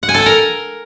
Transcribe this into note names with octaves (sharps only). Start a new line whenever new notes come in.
F#5
G#5
A4
G#5
A#4